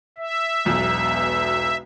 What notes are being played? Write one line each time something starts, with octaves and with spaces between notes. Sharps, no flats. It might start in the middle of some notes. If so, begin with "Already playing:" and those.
E5
E1 B1 E2